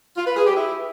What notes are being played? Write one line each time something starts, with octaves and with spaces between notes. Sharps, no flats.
F4
B4
G#4
G4
E4